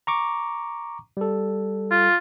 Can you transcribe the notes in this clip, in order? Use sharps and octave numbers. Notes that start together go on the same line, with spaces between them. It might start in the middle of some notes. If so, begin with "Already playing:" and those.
A#5 C#6 D6
G3 A4
F4